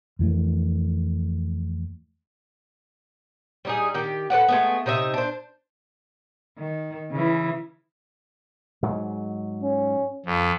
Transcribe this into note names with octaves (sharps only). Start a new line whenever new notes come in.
F2 E3 A3
G3 D#4 G#4
D#3 G4
A4 B4 D5 F#5
G#3 A3 B3
C3 D#4 D#5 E5
D4 C5
D#3
C#3 E3
G#2 F#3
C#4
F2 F3